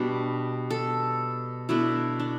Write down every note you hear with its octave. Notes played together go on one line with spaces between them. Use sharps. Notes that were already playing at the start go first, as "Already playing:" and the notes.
Already playing: B2 G3 D4
A4
B2 A3 D4 E4
D4